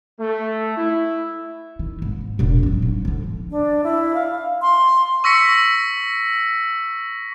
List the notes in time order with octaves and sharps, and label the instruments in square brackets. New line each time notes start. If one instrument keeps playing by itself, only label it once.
[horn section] A3
E4
[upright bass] D#3
G#2
E1 A#2
F#3 C#4
G#2
D3 F3
[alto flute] D4
E4
F5
C6
[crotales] C#6 E6 A#6 B6 C#7